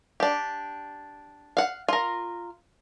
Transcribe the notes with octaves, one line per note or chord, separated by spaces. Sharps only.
D4 G4
F5 F#5
F4 A#4